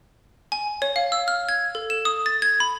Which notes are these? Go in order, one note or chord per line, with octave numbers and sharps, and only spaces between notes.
G#5
C#5
F5
E6
F6
G#6
A4
E7
D#6
A6
G#6
B5